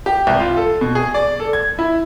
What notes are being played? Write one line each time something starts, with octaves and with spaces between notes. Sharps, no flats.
G4
C2
F4
A4
B2
G#4
D5
A4
G#6
E4